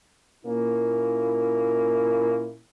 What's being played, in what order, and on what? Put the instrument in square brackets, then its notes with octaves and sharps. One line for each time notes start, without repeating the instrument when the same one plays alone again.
[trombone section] A#2 A#3 C#4 E4